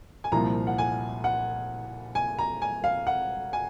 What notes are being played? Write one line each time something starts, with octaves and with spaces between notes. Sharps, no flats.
G#5
C2 A#2 F3 A#5
F#5
G#5
F#5
G#5
A#5
G#5
F5
F#5
G#5